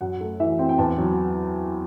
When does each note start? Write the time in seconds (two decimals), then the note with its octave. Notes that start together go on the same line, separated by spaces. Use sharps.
0.01 F#2 F#5
0.21 A3
0.40 E3 E5
0.59 C4 G5
0.69 G5
0.78 E2 A5
0.98 F#3